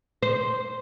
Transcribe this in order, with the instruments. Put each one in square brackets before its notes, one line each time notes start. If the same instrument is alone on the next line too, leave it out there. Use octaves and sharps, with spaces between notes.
[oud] C5